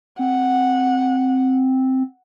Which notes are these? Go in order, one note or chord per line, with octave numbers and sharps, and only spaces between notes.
C4 F#5